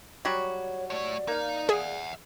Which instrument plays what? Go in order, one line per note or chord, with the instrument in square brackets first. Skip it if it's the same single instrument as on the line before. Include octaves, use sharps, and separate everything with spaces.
[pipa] F#3 G3 F#4 [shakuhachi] C#5
[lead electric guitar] A3 C#5 [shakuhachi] D5
[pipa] A#3 F5 [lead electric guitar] D#4
[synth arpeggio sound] G#4 [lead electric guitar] E5 F#5